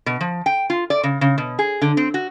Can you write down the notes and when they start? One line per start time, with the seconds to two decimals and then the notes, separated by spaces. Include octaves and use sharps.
0.06 B2
0.21 F3
0.46 G5
0.70 F4
0.90 D5
1.04 C#3
1.21 C#3
1.38 B2
1.59 G#4
1.82 D3
1.97 C4
2.14 F#4